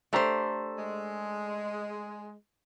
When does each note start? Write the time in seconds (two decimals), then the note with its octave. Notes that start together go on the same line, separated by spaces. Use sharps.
0.13 A3 D4 G4 C5 A#5
0.78 G#3